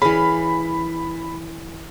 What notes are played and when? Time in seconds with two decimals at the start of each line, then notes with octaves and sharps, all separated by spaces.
0.02 E3 C#4 G#4 F5 B5